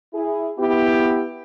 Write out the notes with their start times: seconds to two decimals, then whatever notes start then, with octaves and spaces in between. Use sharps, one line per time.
0.14 E4 G#4
0.57 B3 E4 G4